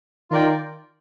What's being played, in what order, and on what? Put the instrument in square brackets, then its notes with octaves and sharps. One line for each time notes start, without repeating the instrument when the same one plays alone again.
[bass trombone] D#3 [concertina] F4 A#4 D5 G5